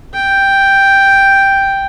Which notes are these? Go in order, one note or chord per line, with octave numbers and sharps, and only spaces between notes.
G5